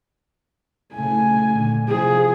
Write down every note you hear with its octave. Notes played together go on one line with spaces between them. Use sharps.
C#3 A3 G#5
A#2 D3
C3 F3 G#4